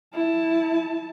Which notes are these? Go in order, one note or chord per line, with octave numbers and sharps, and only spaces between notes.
E4 A5